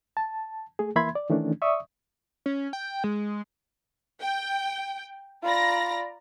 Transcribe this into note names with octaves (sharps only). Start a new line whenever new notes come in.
A5
A3 G#4
E3 A#3 E5 B5 C6 G#6
D5
D#3 E3 A3 C#4 D4
D5 E5 C#6 D#6
C#4
G5
G#3
G5
F4 D5 A#5 B5 A#6